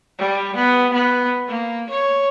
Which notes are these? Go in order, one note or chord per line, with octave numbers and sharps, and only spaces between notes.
G3
B3
B3
A#3
C#5